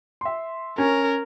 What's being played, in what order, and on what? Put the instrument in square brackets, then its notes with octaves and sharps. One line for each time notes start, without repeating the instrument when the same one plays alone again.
[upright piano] E5 C6
[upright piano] C#4 [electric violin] A#4